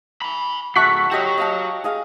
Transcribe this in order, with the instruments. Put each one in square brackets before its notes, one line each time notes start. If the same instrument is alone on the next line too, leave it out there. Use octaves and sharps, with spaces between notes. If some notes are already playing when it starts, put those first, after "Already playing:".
[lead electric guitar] G#5 B5
[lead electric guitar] C#2 G#2 [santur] F#4 A4 E5 [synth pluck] C#6 F#6 B6
[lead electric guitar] F#4 C#5 [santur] G4 D#5 C6
[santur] D#5 F5 A5
G#4 D#5 F5